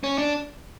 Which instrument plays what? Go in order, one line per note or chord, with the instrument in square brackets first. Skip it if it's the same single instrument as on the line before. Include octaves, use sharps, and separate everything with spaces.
[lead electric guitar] C#4
D4